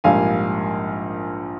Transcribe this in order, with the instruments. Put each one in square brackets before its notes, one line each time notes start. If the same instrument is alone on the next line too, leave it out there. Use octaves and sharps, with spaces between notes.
[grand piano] A#1 G#2 G3 A#3 F5 G#5